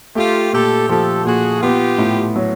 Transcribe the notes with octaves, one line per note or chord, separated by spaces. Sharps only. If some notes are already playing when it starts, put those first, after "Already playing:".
A3 F4 G4
A#2 G4 A4
F3 G4 A4
A#2 F#4 G#4
B3 F4 G4
A2
F#3